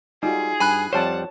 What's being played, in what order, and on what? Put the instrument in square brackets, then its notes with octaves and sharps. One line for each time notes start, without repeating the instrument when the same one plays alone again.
[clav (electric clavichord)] G3 [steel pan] D#4 F4 F#4 [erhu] G#4
[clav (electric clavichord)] G2 [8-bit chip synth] G#5 B5 F#6
[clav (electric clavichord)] F2 G3 C5 [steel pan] C#5 A5 [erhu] F#5